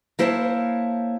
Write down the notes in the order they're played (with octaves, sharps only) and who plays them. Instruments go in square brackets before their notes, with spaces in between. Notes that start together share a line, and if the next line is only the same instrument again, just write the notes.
[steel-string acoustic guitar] A#3 E4 C5 C#5 G#5 A5